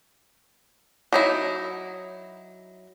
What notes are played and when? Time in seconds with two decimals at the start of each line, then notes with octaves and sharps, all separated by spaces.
1.13 F#3 D#4 E4